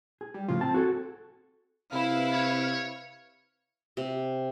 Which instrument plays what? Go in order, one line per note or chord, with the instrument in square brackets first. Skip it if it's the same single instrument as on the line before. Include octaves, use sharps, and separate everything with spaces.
[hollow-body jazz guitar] G#4
[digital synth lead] G3
[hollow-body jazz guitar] A2 C#3 F3 [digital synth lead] F4
[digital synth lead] C4 [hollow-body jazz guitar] A5
[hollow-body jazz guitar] F#4 G#4 A4
[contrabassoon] C3 [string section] E4 B4 [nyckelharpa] F5
[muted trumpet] C#5
[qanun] C3